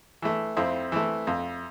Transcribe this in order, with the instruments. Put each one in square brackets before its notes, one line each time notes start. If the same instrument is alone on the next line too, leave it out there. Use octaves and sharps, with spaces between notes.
[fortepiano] E3 A3
F2 C4 E4
E3 A3
F2